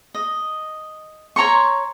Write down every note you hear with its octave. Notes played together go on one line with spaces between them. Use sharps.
D#5
C#5 A#5 C6 C#6